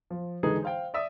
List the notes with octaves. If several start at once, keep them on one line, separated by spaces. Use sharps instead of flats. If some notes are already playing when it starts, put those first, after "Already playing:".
F3
D3 E3 G#3 D#4 G#4 B4
C5 F5 G5
D5 E5 D#6